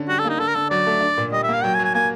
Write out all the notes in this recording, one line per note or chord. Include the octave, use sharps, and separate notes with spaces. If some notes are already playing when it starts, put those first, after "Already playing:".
Already playing: D3 C#4
G3 F#4
A4
A#3 D#4
D3 A4
A#4
D3 A4
F#3 D5
A3
D4
A#2
G3 D#5
E5
A#3
F5
F#3 G5
G#5
F#3
G#5
A#3 G#5